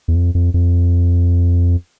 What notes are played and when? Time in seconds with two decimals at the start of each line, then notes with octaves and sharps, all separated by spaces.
0.08 E2
0.15 F2
0.35 F2
0.54 F2